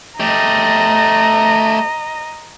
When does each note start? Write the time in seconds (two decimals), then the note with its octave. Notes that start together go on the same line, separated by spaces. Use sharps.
0.20 A3 G4 D#5 A#5